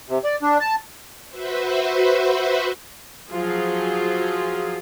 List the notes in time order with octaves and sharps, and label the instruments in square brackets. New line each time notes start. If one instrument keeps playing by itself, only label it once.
[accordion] C3
D5
D4
A5
[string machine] F#4 B4 C5 E5
[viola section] F3 F#3 F4 G#4